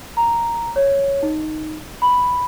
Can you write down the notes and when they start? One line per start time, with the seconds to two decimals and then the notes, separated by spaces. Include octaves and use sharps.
0.17 A#5
0.76 C#5
1.23 D#4
2.02 B5